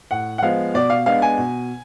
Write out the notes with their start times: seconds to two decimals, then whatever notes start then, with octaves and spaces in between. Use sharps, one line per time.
0.11 A2 F#5
0.38 F#5
0.42 F3 G#3 B3 F5
0.74 B2 D5
0.90 F5
1.06 G#3 B3 D4 F5
1.22 G#5
1.38 B2